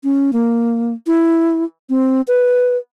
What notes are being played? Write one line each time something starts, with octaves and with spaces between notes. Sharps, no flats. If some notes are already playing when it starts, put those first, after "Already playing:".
C#4
A#3
E4
C4
B4